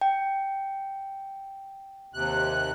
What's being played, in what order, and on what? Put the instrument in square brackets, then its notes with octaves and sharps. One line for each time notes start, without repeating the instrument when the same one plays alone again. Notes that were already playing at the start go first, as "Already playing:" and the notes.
[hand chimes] G5
[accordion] D#2 C3 F#6